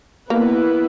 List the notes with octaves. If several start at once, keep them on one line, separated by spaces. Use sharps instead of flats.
A#3 B3 E4 B4